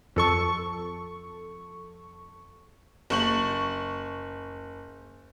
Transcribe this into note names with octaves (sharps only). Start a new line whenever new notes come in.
F2 A4 C#6
F#1 C#6 F#7